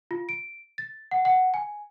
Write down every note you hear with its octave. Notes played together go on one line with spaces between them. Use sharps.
F4
D7
A6
F#5
F#5
G#5